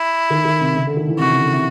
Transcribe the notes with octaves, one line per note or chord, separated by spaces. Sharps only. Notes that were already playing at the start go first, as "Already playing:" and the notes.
Already playing: E4
D#3
D#3
C3
C#3
D3
D#3
E3
C3 F#4
C#3
D3
C3